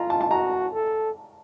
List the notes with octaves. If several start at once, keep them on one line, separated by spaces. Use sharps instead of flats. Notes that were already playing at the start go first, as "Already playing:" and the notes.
Already playing: F4 A#5
A5
A5
F#4 A#5
A4